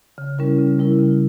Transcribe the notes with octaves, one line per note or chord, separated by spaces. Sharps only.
C#3
G3 C#4 E4 A#4
C#3
G3 C#4 E4 A#4
C#3